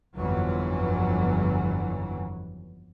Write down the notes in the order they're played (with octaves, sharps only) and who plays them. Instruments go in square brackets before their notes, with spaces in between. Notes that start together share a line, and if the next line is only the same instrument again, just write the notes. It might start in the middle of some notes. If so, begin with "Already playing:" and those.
[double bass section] G1 F2 E3 F#3